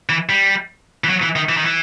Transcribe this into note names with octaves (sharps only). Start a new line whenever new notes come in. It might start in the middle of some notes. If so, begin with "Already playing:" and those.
E3
G3
E3
F#3
E3
D#3
E3
D#3
E3